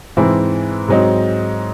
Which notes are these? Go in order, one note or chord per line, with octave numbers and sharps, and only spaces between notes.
G#2 E3 C4 E4
G#2 F#3 C4 D#4